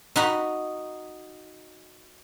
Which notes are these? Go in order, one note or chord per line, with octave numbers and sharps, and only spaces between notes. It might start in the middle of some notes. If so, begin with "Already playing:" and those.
D#4 F#4 B5